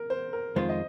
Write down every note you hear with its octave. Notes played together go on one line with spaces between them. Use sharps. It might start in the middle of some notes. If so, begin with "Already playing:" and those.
Already playing: A#4
C5
A#4
F2 D#3 G#3 F4 C5
D#5